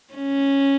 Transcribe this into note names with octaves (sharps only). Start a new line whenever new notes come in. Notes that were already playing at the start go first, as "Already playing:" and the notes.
C#4